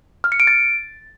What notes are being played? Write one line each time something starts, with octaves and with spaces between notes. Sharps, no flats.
F6
C#7
D7
A6